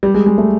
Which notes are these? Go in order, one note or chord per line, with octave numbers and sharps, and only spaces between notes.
G3
G#3
G#3
A3